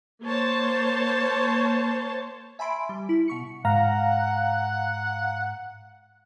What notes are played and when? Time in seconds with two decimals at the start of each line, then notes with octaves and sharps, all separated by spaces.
0.23 A#3 C5 C#5 A5
2.59 E5 G#5 A5 B5 C6 D7
2.89 G3
3.09 E4
3.28 B2 C#6 C#7
3.65 G#2 F5 F#5 A#5